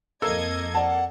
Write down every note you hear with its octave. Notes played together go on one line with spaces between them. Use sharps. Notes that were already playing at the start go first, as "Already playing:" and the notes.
F2 A#3 A4 D#5 E6 G#6
D5 F#5 A5